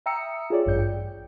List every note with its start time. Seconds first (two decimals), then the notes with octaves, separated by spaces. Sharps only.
0.06 E5 G5 A#5 D#6 E6 C#7
0.50 F4 G#4 C#5 D5
0.66 A1 G2 G6 C#7
0.79 G5